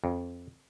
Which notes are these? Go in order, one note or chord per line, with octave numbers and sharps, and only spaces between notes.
F2